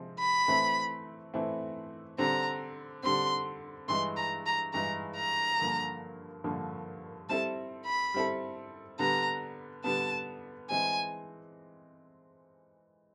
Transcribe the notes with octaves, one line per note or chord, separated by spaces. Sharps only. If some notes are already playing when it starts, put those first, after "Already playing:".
Already playing: C3 F3 G#3 C4
B5
E3 A3 C4 E4
E3 A3 C4 E4
D3 G3 C4 A#5
D3 G3 C4 C6
G2 E3 G#3 C6
A#5
A#5
G2 E3 G#3 A#5
A#5
G2 D3 F3 A#3
G2 D3 F3 A#3
G3 C4 E4 A4 A5
B5
G3 C4 E4 A4
D3 G3 B3 A#5
D3 G3 B3 A5
E3 G#3 C4 G#5